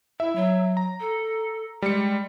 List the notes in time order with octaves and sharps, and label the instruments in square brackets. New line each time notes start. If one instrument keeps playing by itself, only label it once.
[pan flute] E4 [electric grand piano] E5
[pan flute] F#3
[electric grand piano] A#5
[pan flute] A4
[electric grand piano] G3 C#7 [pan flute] G#3